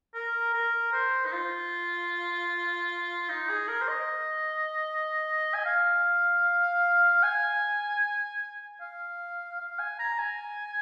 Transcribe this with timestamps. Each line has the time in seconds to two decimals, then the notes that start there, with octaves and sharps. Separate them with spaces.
0.14 A#4
0.53 A#4
0.93 C5
1.26 D#4
1.32 F4
3.29 D#4
3.49 G#4
3.68 A#4
3.81 C5
3.88 D#5
5.54 G#5
5.66 F5
7.23 G#5
8.81 F5
9.59 F5
9.79 G#5
9.99 A#5
10.18 G#5